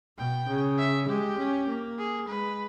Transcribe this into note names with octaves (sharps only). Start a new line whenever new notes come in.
B2 G5
C#3
E5
G#3 G4
C#4
A#3
G#4
G#3 B4